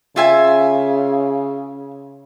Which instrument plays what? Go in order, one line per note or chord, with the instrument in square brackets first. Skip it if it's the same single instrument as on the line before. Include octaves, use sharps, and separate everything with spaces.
[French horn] C#3 [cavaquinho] F4 E5 G#5